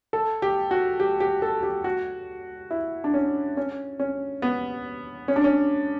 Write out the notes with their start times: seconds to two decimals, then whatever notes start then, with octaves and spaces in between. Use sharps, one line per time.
0.13 A4
0.42 G4
0.71 F#4
1.00 G4
1.20 G4
1.42 A4
1.63 G4
1.84 F#4
2.71 E4
3.04 D4
3.14 C#4
3.57 C#4
4.00 C#4
4.42 B3
5.28 C#4
5.36 D4
5.44 C#4